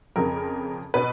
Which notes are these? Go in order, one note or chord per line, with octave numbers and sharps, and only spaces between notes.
F2 C#3 F3 A#4
B2 B4